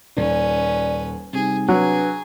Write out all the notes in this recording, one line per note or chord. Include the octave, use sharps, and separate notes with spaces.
D#1 C#4 B4 D5
C3 G3 D#4 G#4
F#3 D4 G#4 B4